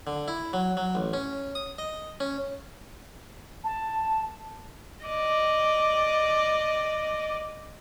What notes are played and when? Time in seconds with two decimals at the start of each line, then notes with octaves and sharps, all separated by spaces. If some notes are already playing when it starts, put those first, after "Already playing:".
0.07 D3
0.28 E4
0.53 F#3
0.77 F#3
0.95 A1
1.13 C#4
1.55 D#6
1.78 D#5
2.20 C#4
3.63 A5
5.05 D5 D#5